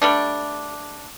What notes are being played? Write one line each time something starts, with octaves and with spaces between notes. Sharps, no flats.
G3 A3 D4